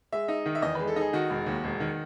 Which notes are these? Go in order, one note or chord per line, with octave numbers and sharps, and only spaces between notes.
G#3 E5
D#4
D#3
E5
E2 D#5
G#3 B4
A4
D#4 G#4
D#3 F#4
E1
D#2
E1
D#3